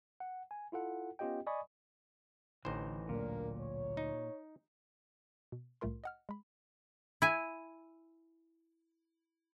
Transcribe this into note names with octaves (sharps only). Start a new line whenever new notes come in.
F#5
G#5
E4 F4 A4 F#5
B3 C#4 F4 G4 D#5 G5
D5 D#5 G#5 B5 C#6 D#6
A1 D3 E3 D#4 C5
D2 A#2 F#3 A#3 D4 A#4
C#5
D#4
B2
C2 A2 A3 F4 A#4 C6
D#5 F#5 F6
G#3 B5
E4 G#5